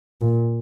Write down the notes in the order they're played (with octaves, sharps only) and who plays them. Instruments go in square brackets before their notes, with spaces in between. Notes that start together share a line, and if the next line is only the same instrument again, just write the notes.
[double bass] A#2